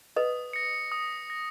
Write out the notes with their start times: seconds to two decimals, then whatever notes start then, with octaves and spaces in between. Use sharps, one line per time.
0.16 B4 D#5 D#6
0.53 A#6 C#7
0.92 D#6
1.29 A#6 C#7